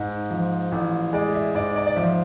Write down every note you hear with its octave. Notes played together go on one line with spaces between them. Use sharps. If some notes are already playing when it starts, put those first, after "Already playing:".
Already playing: G#2
F3
A1
G#3 D5
E5
G#2 D5
D5
D5
F3 E5